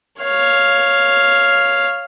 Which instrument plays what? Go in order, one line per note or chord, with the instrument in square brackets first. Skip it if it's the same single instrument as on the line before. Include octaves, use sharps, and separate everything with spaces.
[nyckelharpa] C#5 F5